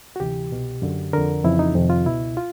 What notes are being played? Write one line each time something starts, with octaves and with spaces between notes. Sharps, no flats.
F#4
D2 C3 E3 G4
C2 B2
F#2 D3
F2 D3 A#4
F2 C#3 E3 E4
D#4
F2 C3 D#3
F4
C#2 B2 E4
F4